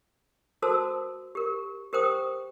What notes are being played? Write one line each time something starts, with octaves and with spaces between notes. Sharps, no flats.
F#4 A4 A#4 C5 A5 E6
G4 A#4
G4 A#4 C5 G5 D#6